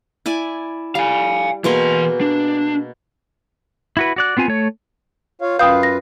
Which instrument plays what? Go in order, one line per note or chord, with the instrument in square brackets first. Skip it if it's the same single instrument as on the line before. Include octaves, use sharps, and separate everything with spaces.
[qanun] E4 D5 G#5
[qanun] G3 [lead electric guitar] F5 G#5
[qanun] B2 A#3 G#4 [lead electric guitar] E3 C6
[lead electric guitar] D4
[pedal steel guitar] E4 F#4 B4
F#4 D5 F#6
B3 C4 F4 G#5
A3 C#5
[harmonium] F4 C#5 F5
[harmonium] F#2 F4 B4 [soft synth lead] F5 [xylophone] G5 D#6 G6
[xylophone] A#6